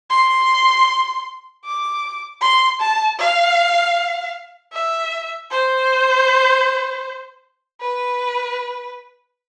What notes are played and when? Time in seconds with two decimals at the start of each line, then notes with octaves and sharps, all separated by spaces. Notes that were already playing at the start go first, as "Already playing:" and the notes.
0.10 C6
1.65 D6
2.41 C6
2.80 A5
3.19 F5
4.73 E5
5.50 C5
7.81 B4